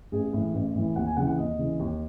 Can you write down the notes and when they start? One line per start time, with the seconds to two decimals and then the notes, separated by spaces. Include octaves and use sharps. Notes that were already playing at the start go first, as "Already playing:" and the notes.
0.12 A1 G#4
0.33 A2 E3
0.54 A1
0.75 A2 E3
0.96 D#2 F#5
1.06 G#5
1.17 C#3 E3 F#5
1.27 F#5
1.38 D#2 D#5
1.59 C#3 E3
1.80 D#2